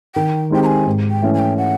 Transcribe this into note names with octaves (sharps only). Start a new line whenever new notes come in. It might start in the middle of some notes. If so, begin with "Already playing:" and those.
D#3 G5
G#3 C4 D#4 G4 G5
A#5
G#5
G#2
G5
E3 A3 C#4
G#5
G5
F#5